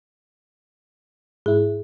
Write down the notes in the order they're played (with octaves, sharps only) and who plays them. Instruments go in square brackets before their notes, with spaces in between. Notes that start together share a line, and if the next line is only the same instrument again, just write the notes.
[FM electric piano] G#2 E4 [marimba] G#4